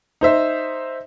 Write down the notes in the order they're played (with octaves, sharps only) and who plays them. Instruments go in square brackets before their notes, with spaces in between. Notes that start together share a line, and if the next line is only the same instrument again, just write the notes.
[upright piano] D#4 C5 E5